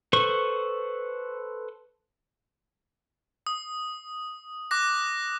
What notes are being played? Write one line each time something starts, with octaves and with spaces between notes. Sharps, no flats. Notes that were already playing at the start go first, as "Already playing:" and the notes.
A4 B4 C5 C#6
D#6
D6 F#6 A#6